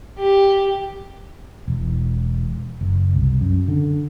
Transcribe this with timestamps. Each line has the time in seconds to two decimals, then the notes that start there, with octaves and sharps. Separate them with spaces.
0.18 G4
1.68 E1
2.81 F#1
3.15 C2
3.41 F#2
3.68 D3